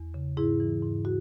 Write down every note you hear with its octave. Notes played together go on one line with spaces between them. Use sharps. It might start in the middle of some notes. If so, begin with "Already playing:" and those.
Already playing: E2
C#3
G#2 E4 G#4
E3
G#2
F#4